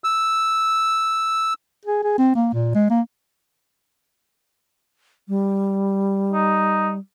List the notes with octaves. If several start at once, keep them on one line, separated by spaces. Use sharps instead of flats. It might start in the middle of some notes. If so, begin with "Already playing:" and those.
E6
G#4
G#4
C4
A#3
A#2
G#3
A#3
G3
D#4